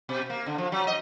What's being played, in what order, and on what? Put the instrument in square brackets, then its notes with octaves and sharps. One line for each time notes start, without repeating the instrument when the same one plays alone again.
[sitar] B2
A#3
D3
F3
F#3
D#5